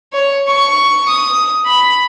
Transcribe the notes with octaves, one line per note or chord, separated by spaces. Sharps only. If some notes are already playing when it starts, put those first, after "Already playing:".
C#5
C#6
D#6
B5